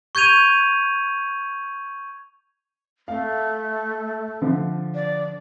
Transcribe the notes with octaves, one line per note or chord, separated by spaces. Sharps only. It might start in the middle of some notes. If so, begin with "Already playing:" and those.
C#6 G6 G#6 D#7 F7
A3 F5
D3 F3
D5